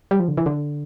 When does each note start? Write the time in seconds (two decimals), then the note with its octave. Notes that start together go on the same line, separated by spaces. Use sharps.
0.11 G3
0.20 F3
0.28 D3
0.37 E3
0.46 D3